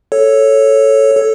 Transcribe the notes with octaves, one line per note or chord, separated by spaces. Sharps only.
A4 C#5
A4